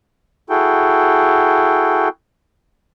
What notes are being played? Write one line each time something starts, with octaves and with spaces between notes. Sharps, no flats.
E4 F#4 G#4 A4 G5